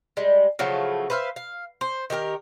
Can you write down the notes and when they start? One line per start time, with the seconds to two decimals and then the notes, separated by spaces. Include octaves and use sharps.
0.17 G3 G#3
0.59 C#3 F3 F#3 A3
1.10 B4 C5 E5 F5
1.36 F5
1.81 C5
2.10 D#3 G4 G#4 A#4